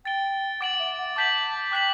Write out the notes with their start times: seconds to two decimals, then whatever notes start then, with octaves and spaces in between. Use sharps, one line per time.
0.05 G5 A6 D7 G7
0.61 F#5 D6 A6 D7 F#7
0.79 E5
0.98 F#5
1.16 A5 D6 G6 B6 F#7
1.71 G5 D6 F#6 B6 F#7